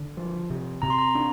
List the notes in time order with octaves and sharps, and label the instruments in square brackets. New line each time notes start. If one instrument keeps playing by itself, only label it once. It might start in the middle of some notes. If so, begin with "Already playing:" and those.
Already playing: [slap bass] D3
F3
C3
[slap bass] C3 [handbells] A#5
[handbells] C6
A#5
[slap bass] D4